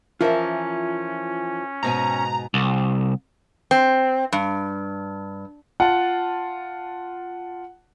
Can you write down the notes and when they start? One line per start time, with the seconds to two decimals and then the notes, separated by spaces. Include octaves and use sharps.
0.21 E3 F3 C#4 F4 A#4 E5
1.83 G#2 B2 G#5 A#5
2.54 C2
3.71 C4
4.32 G2
5.80 F4 F#5 A5